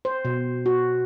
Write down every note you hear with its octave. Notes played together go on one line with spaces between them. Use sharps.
C5
B2
F#4